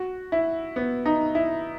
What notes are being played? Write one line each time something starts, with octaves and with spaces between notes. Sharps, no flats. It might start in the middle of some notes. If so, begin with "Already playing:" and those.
Already playing: F#4
E4
B3
D#4
E4